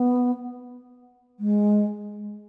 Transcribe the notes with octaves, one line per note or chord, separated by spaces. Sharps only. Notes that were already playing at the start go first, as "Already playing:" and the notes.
Already playing: B3
G#3